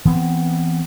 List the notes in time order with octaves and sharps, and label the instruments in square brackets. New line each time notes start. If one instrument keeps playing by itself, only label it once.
[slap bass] E3 B3 C4